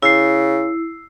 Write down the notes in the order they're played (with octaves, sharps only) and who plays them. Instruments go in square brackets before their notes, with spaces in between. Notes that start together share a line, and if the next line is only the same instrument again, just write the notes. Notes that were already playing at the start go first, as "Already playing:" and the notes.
[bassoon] C#3 [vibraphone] E4 [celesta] E6 C7